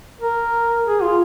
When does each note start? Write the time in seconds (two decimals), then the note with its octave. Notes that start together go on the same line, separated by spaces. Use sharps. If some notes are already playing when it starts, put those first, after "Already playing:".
0.21 A#4
0.86 G#4
1.02 F4